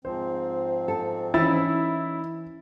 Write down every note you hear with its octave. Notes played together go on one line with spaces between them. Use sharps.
G#2 F3 C4 C5
A4
E3 C#4 D#4 E4 E6 A6